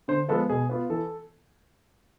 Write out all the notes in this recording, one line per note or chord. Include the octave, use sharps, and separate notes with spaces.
D3 C5
F3 G#3 B3 A4
B2 G#4
B3 F4
E3 A4